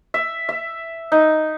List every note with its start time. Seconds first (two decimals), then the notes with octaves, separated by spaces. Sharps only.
0.14 E5
0.49 E5
1.12 D#4